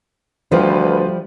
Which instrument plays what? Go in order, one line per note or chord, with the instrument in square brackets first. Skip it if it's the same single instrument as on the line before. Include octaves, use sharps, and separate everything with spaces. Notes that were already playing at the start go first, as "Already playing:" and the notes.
[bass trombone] D2 [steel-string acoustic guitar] F3 G3 [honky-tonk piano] F4 B4 C5